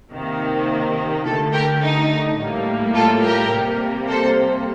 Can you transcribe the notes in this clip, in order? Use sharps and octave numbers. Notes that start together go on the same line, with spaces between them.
C3 D#3 A#3
D3 A3 F4 A4
G4 A#4
D#4
A2 G3 A#3
F4 A4
G4 A#4
C3 G3 A#3
A4 C5